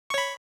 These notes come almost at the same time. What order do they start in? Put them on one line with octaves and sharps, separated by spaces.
C#6 C#5 B5